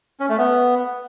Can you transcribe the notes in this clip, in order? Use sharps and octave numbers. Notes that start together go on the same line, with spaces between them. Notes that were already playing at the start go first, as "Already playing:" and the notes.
C#4
A3
B3